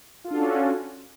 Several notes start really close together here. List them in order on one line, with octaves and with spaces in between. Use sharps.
F4 A4 D4 F#4 C#4